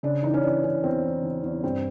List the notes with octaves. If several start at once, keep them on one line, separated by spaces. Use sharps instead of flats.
C#3 D4
E3 D#4
C#4
E3 D4
E3 C#4
E2 C4
E3
E2
E2
G2 C4